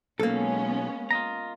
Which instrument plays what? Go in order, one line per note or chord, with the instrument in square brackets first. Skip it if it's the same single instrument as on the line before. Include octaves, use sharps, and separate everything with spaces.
[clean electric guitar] B1 [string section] G#3 B3 C#4 [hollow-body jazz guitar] A#3 A4
[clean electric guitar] F4 D#5 A#5